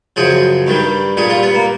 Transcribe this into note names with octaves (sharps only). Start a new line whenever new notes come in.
F#2 C#3 F3 G#4
G2 D#3 G3
A#2 G3 G#4
F4
B3
A#3